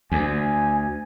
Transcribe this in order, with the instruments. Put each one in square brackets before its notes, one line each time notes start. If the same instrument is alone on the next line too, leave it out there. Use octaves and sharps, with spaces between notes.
[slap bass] D2 [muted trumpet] G#5